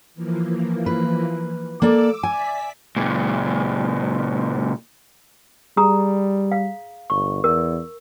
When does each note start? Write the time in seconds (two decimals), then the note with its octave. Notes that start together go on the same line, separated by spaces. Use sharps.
0.14 E3 F3 A#3
0.86 B4
1.82 A#3 A4 D5 D6 E6
2.23 D5 E5 G#5 B6
2.96 C#2 A#2
5.77 G3 G#4 A#5 D#6
6.52 F5
7.10 G1 C#6
7.44 E2 A#4